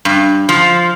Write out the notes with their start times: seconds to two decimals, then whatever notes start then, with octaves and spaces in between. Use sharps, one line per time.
0.05 G2
0.49 F3